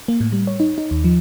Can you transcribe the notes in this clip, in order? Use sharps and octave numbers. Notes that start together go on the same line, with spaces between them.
A#3
A2
G3
C#5
D#4
D#4
D#2
F3